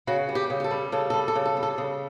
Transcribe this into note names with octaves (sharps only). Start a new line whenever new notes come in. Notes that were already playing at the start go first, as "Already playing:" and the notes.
C#3 F#4
G3
G4
C#3
G4
A4
G3
C#3 A4
G3 A4
A4
C#3
A4
G3
A4
C#3